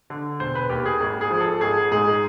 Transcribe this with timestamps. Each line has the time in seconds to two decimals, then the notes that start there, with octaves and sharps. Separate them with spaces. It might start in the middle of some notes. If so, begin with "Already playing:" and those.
0.10 D3
0.40 E1 C5
0.55 B4
0.70 D#2 G4
0.86 G#4
1.00 G#1
1.21 G#4
1.31 F3
1.41 A4
1.61 G#1 G#4
1.92 G#2 G#4